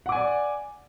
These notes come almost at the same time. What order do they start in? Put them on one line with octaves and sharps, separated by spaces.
F#5 D6 G#5 D5